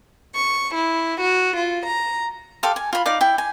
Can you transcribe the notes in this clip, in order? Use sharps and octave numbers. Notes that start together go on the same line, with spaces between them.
C#6
E4
F#4
F4
A#5
G4 A4 F5 C6
G#5
F4 B5
D#4 D5 F5 D6
E4 G5
G#5